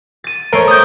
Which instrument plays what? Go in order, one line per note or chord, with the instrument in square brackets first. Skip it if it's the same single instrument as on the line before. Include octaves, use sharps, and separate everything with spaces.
[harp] A6 D#7
[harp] A3 C5 D7 [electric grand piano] A#4 C#5
[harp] D#6 G6